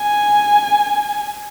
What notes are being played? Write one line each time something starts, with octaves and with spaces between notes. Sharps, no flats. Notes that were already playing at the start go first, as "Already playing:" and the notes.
Already playing: G#5